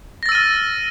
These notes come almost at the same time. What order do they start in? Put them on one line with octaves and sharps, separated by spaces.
A#6 A6 E6 D#7 F6